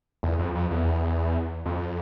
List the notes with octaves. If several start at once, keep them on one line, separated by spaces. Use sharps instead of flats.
E2
F2
F2
E2
F2